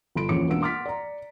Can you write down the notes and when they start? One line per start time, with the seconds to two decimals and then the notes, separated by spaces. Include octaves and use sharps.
0.16 G1 A4 B5 C6 D7
0.29 A#1 E2 A#3 C#4 D6 C#7
0.48 E1 A#3 B3 D4 E6 D7
0.61 F#5 C6 D6 F6 A6 B6
0.86 D5 A#5